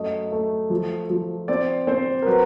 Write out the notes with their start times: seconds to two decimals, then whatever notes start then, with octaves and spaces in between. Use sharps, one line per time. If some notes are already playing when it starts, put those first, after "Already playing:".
Already playing: F#2 A3 D#5
0.32 A3
0.70 F3
1.10 F3
1.48 C4 D5
1.87 C4 C5
2.22 A#4
2.26 F#3 B4